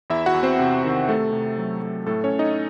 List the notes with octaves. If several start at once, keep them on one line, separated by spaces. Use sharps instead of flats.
E2 E4 E5
F#4 F#5
E2
C4 C5
C3
D#3
C3 A3 A4
C3
F#3
A3
A2 A3 A4
C#4 C#5
A2
D#4 D#5